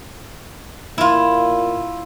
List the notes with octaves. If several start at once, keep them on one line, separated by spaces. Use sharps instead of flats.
A#2 E4 F4